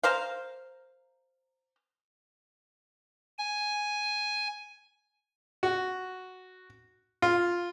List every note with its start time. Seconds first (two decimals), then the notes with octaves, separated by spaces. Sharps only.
0.03 A#4 C5 F5
3.38 G#5
5.63 F#4
7.22 F4